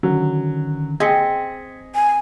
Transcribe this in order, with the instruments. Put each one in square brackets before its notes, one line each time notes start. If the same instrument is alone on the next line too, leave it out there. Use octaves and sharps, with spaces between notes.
[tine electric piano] D3 D#3 C#4 [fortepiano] F#3
[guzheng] C4 [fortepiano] G#4 D#5 [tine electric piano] G#6 B6 C#7
[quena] G#5